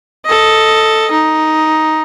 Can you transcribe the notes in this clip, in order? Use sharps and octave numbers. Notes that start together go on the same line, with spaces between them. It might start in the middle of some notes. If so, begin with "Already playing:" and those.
A4 D#5
D#4